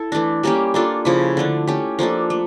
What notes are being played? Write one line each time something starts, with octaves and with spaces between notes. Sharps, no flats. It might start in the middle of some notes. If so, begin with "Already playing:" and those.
Already playing: E4 A4
E3 A3 D4
G3 A#3 C#4 G4
A#3 D4 F4 A4
C#3 F3 C#4 E4
D3 A3 D4
A3 C#4 G4
F3 A#3 D4 A4
A3